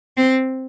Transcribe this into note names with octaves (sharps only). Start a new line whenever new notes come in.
C4